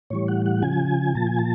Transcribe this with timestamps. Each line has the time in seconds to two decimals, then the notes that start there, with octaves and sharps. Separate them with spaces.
0.10 A2 E3 G3 C#5
0.28 F#5
0.46 F#5
0.62 C#3 F3 G#5
1.15 A#2 F3 A5
1.27 G#5
1.39 A5